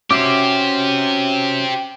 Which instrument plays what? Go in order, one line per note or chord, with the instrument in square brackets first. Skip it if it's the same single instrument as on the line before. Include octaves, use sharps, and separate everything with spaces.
[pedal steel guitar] C#4 F#4 E5 [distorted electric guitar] G4 C5 [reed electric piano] D6